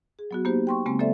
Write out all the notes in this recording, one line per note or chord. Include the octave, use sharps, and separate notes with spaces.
G#4
F#3 B3 F#4
A#3 B3 D#4 G4 C5
G5 C6 C#6
C#3 G#3 A#3 C4
F#3 A#3 A4 C5 D5 E5